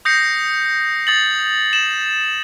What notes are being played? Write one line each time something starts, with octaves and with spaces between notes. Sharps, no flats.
D#6 G6 A#6 C7 C#7
D#6 A6 F#7
E7 F#7